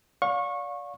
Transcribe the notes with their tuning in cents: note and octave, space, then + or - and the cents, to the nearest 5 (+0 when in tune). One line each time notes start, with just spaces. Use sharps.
D5 -30 F5 +35 C#6 -20